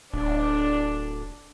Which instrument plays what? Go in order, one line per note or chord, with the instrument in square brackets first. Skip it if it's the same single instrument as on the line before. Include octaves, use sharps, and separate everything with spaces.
[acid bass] D1 [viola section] D4